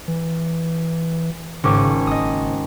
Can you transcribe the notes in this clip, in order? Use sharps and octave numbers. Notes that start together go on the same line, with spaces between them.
E3
G#1 C#3 C#4 D6
F#1 D#5 D#6